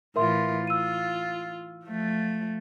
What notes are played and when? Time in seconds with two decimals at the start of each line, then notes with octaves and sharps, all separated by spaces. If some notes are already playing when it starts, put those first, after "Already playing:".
0.16 A2 E3 F4 A#4 E5 C6
0.67 F4 E6 D#7
1.85 F3 A3